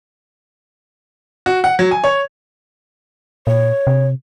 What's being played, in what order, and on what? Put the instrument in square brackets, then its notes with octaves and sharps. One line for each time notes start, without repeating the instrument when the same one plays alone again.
[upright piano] F#4
F#5
F#3
G#5
C#5
[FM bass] A#2 [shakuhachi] C#5
[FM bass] C3